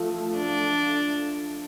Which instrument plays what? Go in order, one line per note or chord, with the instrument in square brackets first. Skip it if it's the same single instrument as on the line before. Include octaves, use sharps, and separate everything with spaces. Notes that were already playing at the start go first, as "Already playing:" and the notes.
Already playing: [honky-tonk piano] F3 A3
[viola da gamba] D4